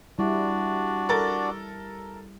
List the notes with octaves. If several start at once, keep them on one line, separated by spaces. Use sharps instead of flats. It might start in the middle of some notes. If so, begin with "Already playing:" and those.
G3 D4 E4 F#4 D5
A4 A#4 A6